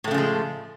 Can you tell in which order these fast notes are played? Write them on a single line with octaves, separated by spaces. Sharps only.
A2 A3 C#3 F3 G#3